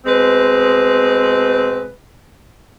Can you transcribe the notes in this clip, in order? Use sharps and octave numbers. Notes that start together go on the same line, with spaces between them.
B2 G#3 C4 B4